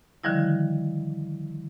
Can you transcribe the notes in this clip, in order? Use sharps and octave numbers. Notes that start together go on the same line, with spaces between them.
D3 D#3 F3 G3 E4